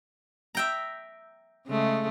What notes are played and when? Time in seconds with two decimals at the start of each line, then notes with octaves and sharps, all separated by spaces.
0.55 E5 G5 A#5
1.67 C#3 G#3 A3